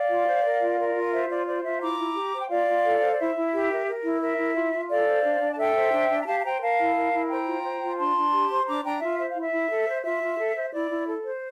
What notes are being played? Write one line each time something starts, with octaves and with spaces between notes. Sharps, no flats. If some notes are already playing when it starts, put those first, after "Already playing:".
Already playing: D5 F5
F4
C5
A#4
F4
A#4
F4
C5 E5
F4 D5
C5 D5
F4 E5
E4 A#5 D6
E4
G4
C5
G5
F4 D5 F5
F4
A4
C5
D5
E4 E5
E4
G4
A#4
A#4
E4
A#4 E5
E4
F4
F4
A4 D5 F5
C5
D4
D4
A5
A4 E5 G5
C5
D4
D4
A#5
G4 F5 A5
A5
C5 G5 A#5
A#4 F5 A5
E4
A#4
E4
C5 G5 A#5
F4
C5
F4
D4 A5 C6
D4
G4
C5
D4 A#5 D6
D4 G5 A#5
F4 E5
C5 E5
F5
E4
E5
E4
A4
C5
F4 E5
F4
A4
C5
E4 D5
E4
A4
C5